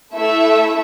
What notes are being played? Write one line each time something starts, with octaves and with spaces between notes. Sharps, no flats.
A3 E4 A4 E5